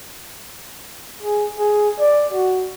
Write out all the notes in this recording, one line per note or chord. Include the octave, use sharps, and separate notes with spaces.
G#4
G#4
D5
F#4